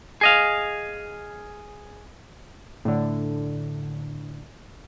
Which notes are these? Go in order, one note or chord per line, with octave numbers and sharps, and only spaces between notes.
G#4 D#5 F5
A2 D3